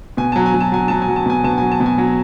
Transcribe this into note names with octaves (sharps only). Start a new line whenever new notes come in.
B2 G#5
F#3 A5
G#5
F#3
A5
F#3 G#5
F#3 A5
G#5
F#3
A5
B2 G#5
B2 A5
F#3 G#5
A5
B2
G#5
F#3